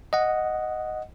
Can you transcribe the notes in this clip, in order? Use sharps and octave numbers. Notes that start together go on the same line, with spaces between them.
D#5 F#5